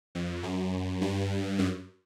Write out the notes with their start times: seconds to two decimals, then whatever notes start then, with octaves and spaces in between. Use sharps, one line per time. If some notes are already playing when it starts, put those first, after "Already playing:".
0.15 F2
0.43 F#2
1.01 G2
1.59 F#2